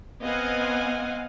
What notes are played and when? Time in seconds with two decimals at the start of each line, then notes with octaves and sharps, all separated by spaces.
0.22 B3 C4 D#5 F5 F#5 G#5